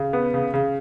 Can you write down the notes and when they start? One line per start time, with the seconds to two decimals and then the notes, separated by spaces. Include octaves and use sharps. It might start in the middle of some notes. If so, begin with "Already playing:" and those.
Already playing: C#3
0.13 B3
0.34 C#3
0.54 C#3